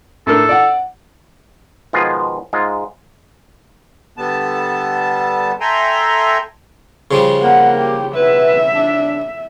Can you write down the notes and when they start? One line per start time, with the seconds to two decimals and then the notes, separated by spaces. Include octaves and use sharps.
0.27 A2 D4 A4 A#4
0.49 D5 F#5
1.93 B2 D#3 F3 G#3 F4 G#4
2.53 G#2 G#3 F4
4.18 D3 G3 B3 A5
5.61 A4 E5 G5 G#5 A#5 C6
7.11 C#3 F3 G3
7.43 A#3 F#5
7.79 G4
8.16 B2 E4 B4 E5
8.74 D4